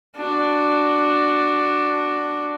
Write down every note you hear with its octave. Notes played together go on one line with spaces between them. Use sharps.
D4 F#4